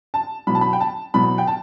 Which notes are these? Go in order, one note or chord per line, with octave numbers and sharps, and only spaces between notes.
A5
E2 B2 F#3 B5
A5
B5
G5
A5
E2 B2 F#3 B5
G5
A5